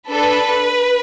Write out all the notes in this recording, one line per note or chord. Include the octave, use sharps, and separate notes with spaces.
D4 A4 B4